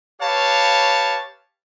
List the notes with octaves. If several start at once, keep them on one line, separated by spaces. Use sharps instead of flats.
G4 B4 C#5 F5 A5